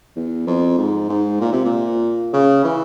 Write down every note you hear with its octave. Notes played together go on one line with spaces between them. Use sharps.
E2
F2
G#2
G#2
A#2
C3
A#2
C#3
E3